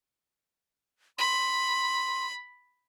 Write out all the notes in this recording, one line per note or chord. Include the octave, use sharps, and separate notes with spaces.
B5 C6